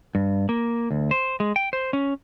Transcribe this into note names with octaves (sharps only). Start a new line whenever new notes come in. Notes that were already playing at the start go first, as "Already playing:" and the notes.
G2
A#3
D2
C5
G#3
G5
C5
C#4